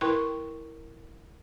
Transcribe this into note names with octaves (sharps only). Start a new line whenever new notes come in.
E4 A#4 B4 G5 C6 C#6